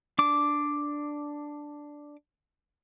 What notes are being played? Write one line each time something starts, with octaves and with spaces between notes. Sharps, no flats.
D4 D6